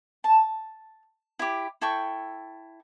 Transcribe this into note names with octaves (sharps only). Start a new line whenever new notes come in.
A5
E4 G4
E4 A4 G5 C#6